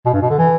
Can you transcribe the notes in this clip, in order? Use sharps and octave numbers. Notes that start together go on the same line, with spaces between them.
B2
G2
B2
D3
E3